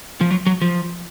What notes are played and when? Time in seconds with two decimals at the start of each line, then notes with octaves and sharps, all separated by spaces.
0.21 F3
0.31 F#3
0.46 F#3
0.62 F3